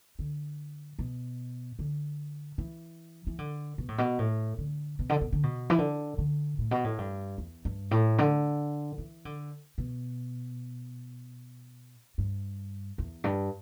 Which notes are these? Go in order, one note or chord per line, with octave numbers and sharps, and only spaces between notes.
D3
B2
D3
E3
E3
D3
B2
A2
B2
A2
D3
B2
D3
B2
D3
B2
E3
D3
D3
A2
B2
A2
G2
E2
G2
A2
D3
E3
D3
B2
G2
E2
G2